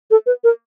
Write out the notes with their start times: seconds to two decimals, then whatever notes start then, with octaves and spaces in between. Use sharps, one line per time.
0.11 A4
0.26 B4
0.44 A#4